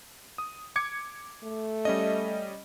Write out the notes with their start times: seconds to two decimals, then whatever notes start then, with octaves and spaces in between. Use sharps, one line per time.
0.38 D#6
0.76 D6 G#6 C#7
1.43 A3
1.85 G3 C#4 D#5